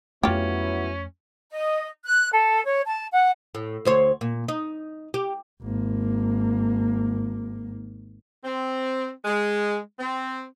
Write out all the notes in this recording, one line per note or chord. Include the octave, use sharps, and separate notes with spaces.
F2 F#3 A3 B3 C#4 E4 F4 G4
D#5
F#6
A4
C#5
A5
F#5
A2
D2 C5 C#5
A#2
D#4
G4
G#1 A#3
C4
G#3
C4